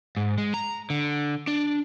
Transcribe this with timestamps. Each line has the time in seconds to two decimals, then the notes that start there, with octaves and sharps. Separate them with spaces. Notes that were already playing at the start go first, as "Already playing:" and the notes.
0.17 G#2
0.38 G#3
0.54 A#5
0.90 D3
1.47 D4